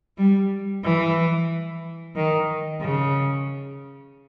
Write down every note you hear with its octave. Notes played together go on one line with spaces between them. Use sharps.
G3
E3
D#3
C#3